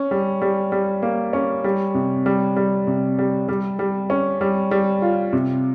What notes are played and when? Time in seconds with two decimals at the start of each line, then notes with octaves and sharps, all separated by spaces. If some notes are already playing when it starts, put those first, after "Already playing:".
Already playing: C#4
0.11 G3
0.42 G3
0.72 G3
1.02 A#3
1.33 C#4
1.64 G3
1.94 C3
2.26 G3
2.56 G3
2.87 C3
3.19 G3
3.49 G3
3.79 G3
4.10 C#4
4.41 G3
4.71 G3
5.02 F4
5.33 C3